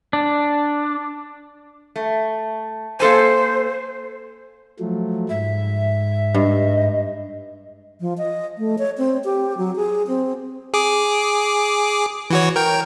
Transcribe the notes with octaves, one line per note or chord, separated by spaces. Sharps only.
D4
A3
A#3 A4 C5 G#5
F3 F#3 A3
G#2 E5
G2 D#5
F3
D#5
A3
C#5
C4
G4
F#3
G#4
C4
G#4 D6
E3 F#4 C#5
A#4 G5